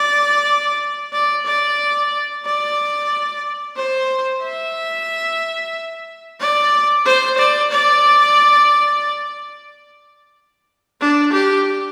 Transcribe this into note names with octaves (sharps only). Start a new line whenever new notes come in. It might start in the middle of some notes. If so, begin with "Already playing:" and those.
Already playing: D5
D5
D5
D5
C5
E5
D5
C5
D5
D5
D4
G4